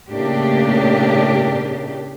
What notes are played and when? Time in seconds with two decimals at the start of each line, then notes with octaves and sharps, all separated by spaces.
0.10 A2 C#3 A#3 D4 G4